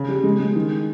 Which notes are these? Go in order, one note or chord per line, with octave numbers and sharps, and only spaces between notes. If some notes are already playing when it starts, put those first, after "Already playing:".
Already playing: C#3
G3
G#3
G#3
D#3